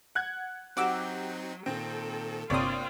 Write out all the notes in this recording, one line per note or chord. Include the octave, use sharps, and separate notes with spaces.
F#5 F#6 G#6
F#3 C4 D#4 F#4 G4 F#5 D6 E6
A#2 D#3 C4 A4
G1 C3 A#3 C4 F4 C#5 D5 D#6